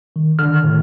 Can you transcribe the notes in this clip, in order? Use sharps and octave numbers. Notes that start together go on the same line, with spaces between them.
D#3
D3 D#3 F6
A2